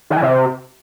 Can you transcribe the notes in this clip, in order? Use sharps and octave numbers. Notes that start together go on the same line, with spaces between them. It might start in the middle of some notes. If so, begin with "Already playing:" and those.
D#3
E3
C3